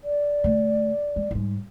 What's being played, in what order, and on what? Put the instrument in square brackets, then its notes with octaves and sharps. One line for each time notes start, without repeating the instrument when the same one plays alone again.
[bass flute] D5
[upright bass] D3 A3
G#3
G#2 G3